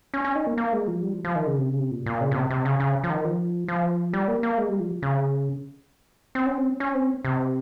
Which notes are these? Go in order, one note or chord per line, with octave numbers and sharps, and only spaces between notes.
C#4
C#4
D#4
A#3
A#3
G#3
F3
G3
F3
F3
D#3
C#3
C3
C#3
C3
A#2
A#2
C#3
A#2
C3
C3
C#3
C#3
F3
D#3
F3
F3
G3
A#3
A#3
G#3
G3
F3
C#3
C4
C#4
C4
C#4
C4
C3